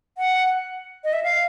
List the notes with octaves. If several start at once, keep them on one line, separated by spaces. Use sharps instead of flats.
F#5
D#5
E5
F5